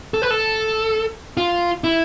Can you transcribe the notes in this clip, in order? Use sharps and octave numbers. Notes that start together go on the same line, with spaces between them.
A4
B4
A4
F4
E4